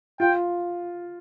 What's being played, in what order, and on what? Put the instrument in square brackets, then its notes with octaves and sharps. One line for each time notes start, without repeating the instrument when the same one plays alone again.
[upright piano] F4 [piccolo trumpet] G5